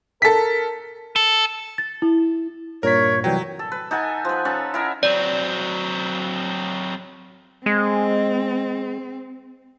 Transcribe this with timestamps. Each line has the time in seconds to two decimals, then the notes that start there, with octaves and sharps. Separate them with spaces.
0.22 A4 A#4 B6
1.16 A4
1.78 A6
2.02 E4
2.83 G2 A#2 A#4 C#5 B6
3.24 C3 E3 F#3 G3 G5
3.59 A4
3.72 B4
3.91 D#4 A4 F#5 G#5
4.25 F3 B4
4.45 C#4 A4 F#5
4.74 E4 A#4 D#5
5.03 F#3 C4 D5
7.66 G#3 C4